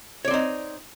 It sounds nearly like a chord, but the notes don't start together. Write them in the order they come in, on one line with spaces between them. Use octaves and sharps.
C#5 D5 C4 D#4